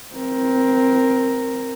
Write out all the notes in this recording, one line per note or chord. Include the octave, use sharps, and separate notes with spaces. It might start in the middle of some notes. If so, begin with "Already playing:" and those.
C4 A#4